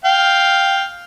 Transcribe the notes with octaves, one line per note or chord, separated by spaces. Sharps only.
F5 G5